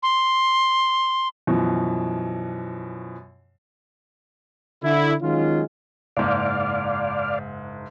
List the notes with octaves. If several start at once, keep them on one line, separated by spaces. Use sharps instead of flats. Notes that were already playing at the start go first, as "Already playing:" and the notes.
C6
F#2 B2 E3 F3
D3 E4
D#3 F#3 G#3 C#4 F4
F#1 G#2 D5 F5